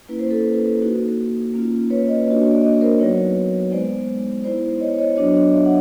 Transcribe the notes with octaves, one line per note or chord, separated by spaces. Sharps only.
A#3 C#4 E4 B4
C5
A4 B4
A#3 D#4 F#4
A#3 C#4 F4
B4 C#5
C#5 D#5
A#3 D4 F#4 C#5 D#5
D5
C#5 D#5
A#4 C5
F#3 B3 D#4 F#4 B4 C#5
G#3 B3 D#4 C5 D5
B3 E4 C5 D5
C#5 D#5
C#5 D#5
F#3 B3 D4 F#4 C#5 D#5
D5 E5
F#5